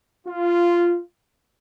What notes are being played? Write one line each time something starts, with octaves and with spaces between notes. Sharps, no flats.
F4